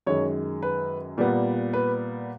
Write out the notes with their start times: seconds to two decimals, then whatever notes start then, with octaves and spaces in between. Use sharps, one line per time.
0.07 F#2 D#3 G#3 C#5
0.63 B4
1.18 A#2 G3 B3
1.73 B4